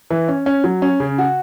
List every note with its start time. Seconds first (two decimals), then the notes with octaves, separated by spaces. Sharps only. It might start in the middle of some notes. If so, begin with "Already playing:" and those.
0.11 E3
0.28 C#4
0.46 C#4
0.64 F#3
0.82 C#4
1.00 C#3
1.18 F#4